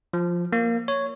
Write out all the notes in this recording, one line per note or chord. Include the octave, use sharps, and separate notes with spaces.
F3
A#3
C#5